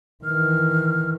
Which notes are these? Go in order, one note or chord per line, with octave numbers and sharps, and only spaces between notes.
D#3 E3 F6